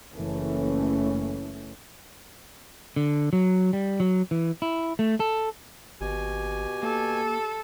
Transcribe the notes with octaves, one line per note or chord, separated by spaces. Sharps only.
F#1 E3 A3 C#4
D3
F#3
G3
F#3
E3
E4
A3
A4
G#1 B2 G4 G#5
A#3 A4